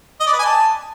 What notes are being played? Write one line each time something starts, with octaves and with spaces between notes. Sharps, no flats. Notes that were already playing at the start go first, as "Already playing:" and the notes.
D#5
D5
B4
G#5
A5